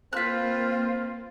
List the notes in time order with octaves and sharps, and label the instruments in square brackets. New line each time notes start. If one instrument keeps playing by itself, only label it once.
[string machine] A#3 [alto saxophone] C4 [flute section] F4 [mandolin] B4 F#6